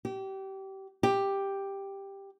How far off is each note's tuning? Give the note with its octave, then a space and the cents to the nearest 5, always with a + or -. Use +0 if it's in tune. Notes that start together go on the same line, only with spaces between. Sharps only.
G4 -25
G4 +5